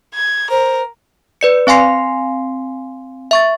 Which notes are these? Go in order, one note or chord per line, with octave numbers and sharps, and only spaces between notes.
G#6
A#4 C5
B4 D5 C#7
C4 F5 G#5 C6 C7
E5 C#6 A6